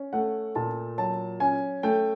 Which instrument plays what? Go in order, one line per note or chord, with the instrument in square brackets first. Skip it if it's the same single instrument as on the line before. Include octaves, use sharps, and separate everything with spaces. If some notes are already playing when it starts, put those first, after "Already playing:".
Already playing: [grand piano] C#4
A3 F#5
A#2 A5
F#3 A5
C#4 G#5
A3 G5